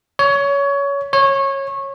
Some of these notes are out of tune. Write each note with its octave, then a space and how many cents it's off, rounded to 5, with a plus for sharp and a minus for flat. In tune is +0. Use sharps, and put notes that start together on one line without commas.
C#5 +20
C#5 -20